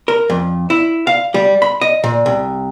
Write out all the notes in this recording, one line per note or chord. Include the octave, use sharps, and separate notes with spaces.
A#4
F2
E4
F5
G3
B5
D#5
A#2
C2